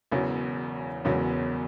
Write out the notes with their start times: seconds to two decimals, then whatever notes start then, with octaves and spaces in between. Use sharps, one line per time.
0.12 E1 E2 C#3 F#3
1.05 E1 E2 C#3 F#3